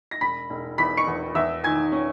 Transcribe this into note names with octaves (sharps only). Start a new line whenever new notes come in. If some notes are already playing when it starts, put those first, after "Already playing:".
A#6
E1 B5 B6
E1
E2 B5 B6
C#6 C#7
E2
E2 E5 E6
D#3 G#5 G#6
C#4